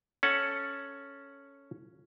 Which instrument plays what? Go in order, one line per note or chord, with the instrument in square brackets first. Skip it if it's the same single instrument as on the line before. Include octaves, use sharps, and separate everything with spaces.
[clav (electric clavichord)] C#4 A4 F#5